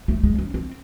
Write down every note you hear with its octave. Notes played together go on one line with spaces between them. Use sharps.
A3
G#3
C#4
C4